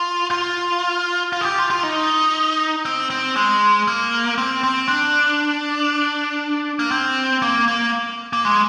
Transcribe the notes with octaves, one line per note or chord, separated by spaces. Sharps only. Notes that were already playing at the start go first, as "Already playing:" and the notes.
Already playing: F4
F4
F4
G#4
G4
F4
F4
D#4
C4
C4
G#3
A#3
C4
C4
D4
A#3
C4
A#3
A#3
A#3
G#3